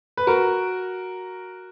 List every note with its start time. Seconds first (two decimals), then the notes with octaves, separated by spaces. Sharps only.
0.17 B4
0.27 F#4 A#4